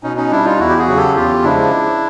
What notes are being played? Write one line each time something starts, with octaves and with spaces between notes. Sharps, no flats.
B2 C#4 D#4
C#4 D#4
G3 D4 E4
D#4 F4
E2 E4 F#4
G4
F#4 G#4
C#3 F#3
G4 A4
E2 F4 G4
C#3 F3 G#3 D4 E4